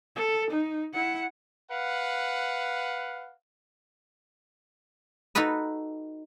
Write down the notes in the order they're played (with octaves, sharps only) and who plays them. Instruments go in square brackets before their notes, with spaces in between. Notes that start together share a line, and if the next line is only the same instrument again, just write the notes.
[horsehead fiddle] A4
D#4
E4 F#5
[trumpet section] B4 F5 F#5
[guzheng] D#4 F#4 A4 B4 D#5